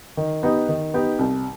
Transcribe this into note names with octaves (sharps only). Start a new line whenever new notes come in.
D#3
B3 D#4 G4
D#3
B3 D#4 G4
C2